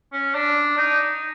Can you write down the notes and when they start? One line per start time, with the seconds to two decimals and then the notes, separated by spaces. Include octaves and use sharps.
0.13 C#4
0.35 D4
0.78 D#4